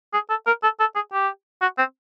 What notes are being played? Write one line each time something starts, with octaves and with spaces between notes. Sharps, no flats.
G#4
A4
A#4
A4
A4
G#4
G4
F#4
C4